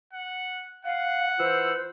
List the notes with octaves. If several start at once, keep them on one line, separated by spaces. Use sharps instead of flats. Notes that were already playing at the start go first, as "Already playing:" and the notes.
F#5
F5 F#5
E3 F4 C5 E6